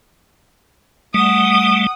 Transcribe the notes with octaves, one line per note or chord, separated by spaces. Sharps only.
G3 A3 F#5 D#6